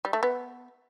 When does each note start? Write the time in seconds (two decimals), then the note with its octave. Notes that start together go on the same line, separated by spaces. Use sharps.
0.05 G3
0.13 A3
0.23 B3